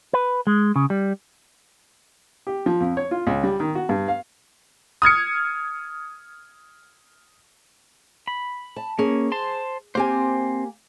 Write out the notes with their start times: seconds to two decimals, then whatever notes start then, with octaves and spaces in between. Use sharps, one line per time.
0.13 B4
0.47 G#3
0.76 C#3
0.90 G3
2.47 G4
2.66 F3
2.81 F2
2.97 C#5
3.11 F4
3.27 C#2
3.44 G3
3.60 D#3
3.75 F#4
3.89 G2
4.08 F5
5.02 D#6 F6 G#6 C#7
8.27 B5
8.76 A5
8.99 A#3 C#4 G#4
9.32 C5 A5 C6
9.95 A#3 C4 G4 C5 G#5